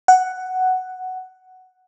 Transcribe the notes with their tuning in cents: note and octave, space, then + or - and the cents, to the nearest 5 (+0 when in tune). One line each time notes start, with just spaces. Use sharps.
F#5 +5